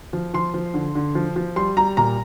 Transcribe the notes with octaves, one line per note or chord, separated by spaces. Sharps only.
F3
F3 C6
F3
D3
D3
F3
F3
G3 C6
G3 A#5
A#2 A#5